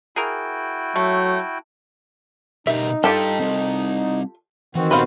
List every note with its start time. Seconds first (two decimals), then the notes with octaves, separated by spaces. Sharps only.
0.16 E4 F#4 G#4 A#4 G5
0.96 F#3 A3
2.67 B2 D#4 G4 A#4 E5
3.04 G3 F4 G4 A4 G5 A5
3.40 G3 C4
4.75 D#3 E3 C4 F#4
4.91 A#2 B3 G4 B4 C5 F5